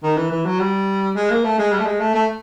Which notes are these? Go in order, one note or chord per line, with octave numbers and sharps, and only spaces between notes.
D#3
E3
E3
F#3
G3
G#3
A#3
A3
G#3
G3
A3
G#3
A3
A3